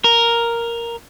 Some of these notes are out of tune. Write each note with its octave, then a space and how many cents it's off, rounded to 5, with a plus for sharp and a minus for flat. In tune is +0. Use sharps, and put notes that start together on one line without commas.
A#4 +0